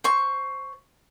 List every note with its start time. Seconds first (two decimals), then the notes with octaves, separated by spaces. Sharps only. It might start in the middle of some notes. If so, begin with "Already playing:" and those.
0.04 C5 C#6